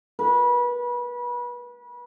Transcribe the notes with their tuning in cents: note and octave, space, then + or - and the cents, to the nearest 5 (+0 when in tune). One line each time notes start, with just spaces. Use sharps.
B4 -30